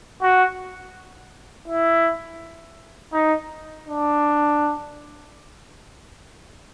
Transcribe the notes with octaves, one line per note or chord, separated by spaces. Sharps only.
F#4
E4
D#4
D4